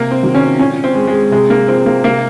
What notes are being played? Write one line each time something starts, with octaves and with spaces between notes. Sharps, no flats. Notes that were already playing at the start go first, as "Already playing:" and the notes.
Already playing: C3 A#3
C4
D#3 F#3
C#4
A#2 C#4
C4
G#3
G#3
C3 G#3
A#3
F3 G#3 C4
A#3
C3 A#3